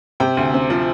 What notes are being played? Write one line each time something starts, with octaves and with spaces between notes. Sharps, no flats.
C3 G5
D2
C4
F3